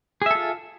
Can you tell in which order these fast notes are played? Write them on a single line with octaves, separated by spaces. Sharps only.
G#4 E5 A4 F4